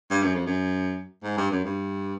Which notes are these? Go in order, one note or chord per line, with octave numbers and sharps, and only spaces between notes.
G2
F#2
F2
F#2
G#2
G2
F#2
G2